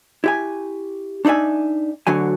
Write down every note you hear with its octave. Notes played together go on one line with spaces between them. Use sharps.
E4 G4 G#5
D4 D#4 D5 E5 G#5
D2 D3 F#3 G#5